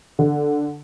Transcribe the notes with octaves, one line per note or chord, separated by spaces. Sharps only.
D3